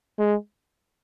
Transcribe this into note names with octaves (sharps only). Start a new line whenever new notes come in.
G#3